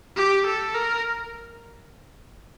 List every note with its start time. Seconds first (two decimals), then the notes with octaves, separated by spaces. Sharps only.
0.16 G4
0.46 A4
0.74 A#4